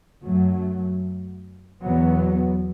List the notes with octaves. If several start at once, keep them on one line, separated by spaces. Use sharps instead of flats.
F#2 F#3 A3
E2 B2 F#3 B3